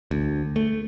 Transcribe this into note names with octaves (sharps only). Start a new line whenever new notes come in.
D2
A3